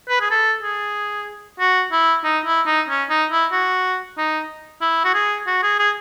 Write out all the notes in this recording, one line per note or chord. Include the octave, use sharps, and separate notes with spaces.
B4
G#4
A4
G#4
F#4
E4
D#4
E4
D#4
C#4
D#4
E4
F#4
D#4
E4
F#4
G#4
F#4
G#4
G#4